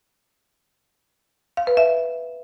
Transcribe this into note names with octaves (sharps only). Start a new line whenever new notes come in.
F5
B4
E5